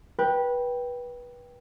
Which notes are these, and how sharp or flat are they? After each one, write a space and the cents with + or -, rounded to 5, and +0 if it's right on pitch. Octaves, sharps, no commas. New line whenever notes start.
B4 -20 G5 +0